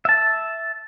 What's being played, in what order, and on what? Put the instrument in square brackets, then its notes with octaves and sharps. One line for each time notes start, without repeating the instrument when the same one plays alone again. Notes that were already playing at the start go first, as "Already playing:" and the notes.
[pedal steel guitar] E5 A5